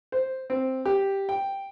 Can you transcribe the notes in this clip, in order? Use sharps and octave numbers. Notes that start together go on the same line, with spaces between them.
C5
C4
G4
G5